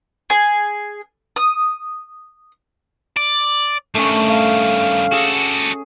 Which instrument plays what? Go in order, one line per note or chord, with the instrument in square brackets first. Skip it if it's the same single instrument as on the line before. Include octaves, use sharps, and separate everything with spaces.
[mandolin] G#4
D#6
[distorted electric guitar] D5
[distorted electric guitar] G2 D#3 [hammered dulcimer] A3 C#4
[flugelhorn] F5
[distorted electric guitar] F#4 A4 [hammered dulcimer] G#4